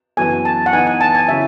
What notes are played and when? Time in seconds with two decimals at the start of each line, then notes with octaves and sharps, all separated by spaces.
0.17 F#2 E3 B3 F#4 A4 G#5
0.45 A5
0.66 F#5
0.73 E3 B3 D#4 G#5
0.87 G#5
1.01 A5
1.15 G#5
1.28 C#3 F#3 C#4 E4 E5